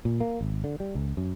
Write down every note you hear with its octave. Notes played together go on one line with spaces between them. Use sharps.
A#2
A#3
G#1
D3
G3
C#2
F#2